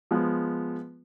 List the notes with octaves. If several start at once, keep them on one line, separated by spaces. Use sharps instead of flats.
F3 G#3 B3